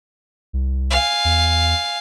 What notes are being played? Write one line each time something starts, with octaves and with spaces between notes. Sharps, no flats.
C2
F5 G#5
E2